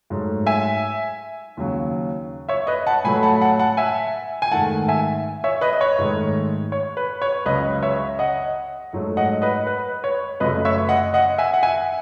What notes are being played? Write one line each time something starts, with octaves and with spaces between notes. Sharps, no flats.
G#2 F#3 A3
E5 G#5
D#2 C#3 F#3
C#5 E5
B4 D#5
F#5 A5
A2 F#3 A3 G#5 B5
B5
F#5 A5
F#5 A5
F#5 A5
E5 G#5
G#5
G#2 D#3 A3 F#5 A5
E5 G#5
C#5 E5
B4 D#5
D#5
C#5
G#2 D#3 A3
C#5
B4
C#5
C#2 C#3 F#3 B4 D#5
C#5 E5
D#5 F#5
G#2 F#3 A3
D#5 F#5
B4 D#5
B4
C#5
F#2 C#3 F#3 A3 B4 D#5
C#5 E5
D#5 F#5
D#5 F#5
E5 G#5
F#5
E5 G#5